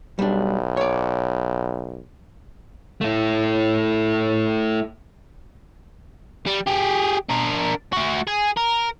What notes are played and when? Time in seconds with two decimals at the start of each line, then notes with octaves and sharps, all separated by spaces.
0.19 B1 G3 D4
0.77 C#5 D5
3.01 A3 E4
6.46 G3
6.66 G4 G#4
7.29 D4 A#4
7.93 A3 F#4
8.27 G#4
8.57 A#4